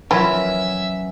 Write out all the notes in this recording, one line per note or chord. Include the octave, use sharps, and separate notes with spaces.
E3 F#3 C#4 E4 F4 A#4 B4 E5